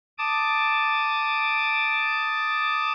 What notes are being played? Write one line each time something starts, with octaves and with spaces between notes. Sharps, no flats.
A5 D6 D#6